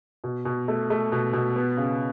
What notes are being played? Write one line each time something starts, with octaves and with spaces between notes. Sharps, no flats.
B2
B2
A3
A3
B2
B2
B3
C#3